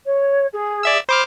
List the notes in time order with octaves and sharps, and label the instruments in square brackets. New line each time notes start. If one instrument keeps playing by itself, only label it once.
[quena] C#5
G#4
[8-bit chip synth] D5 E5 E6
[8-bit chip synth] C5 D6 F6 [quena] B5